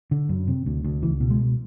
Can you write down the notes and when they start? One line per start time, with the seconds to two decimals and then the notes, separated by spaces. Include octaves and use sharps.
0.11 D3
0.29 F#2
0.47 C3
0.66 D2
0.84 D2
1.03 C#2 E3
1.20 B2
1.30 G#3
1.39 B2